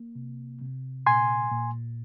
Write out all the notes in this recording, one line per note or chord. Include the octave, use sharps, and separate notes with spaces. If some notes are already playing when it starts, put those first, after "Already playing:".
Already playing: A#3
C3
C3
A#2 G#5 C6
A#2